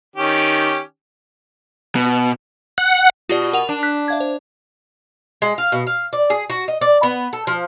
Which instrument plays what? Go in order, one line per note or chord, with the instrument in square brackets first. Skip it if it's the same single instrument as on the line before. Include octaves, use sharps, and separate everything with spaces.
[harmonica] D#3 C#4 G4
[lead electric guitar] B2
[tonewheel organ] F#5
[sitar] B2 [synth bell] F4 G4 D5
[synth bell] A#4 F#5 F7
[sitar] D4
[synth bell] F#6 B6
E5 F5 G#6
C5
[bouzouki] G#3
F5
B2
F5
D5
G#4
F#4
D#5
D5
B3
A4
F3